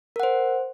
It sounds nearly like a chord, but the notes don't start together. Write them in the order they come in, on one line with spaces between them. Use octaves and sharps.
A#4 F#5 C5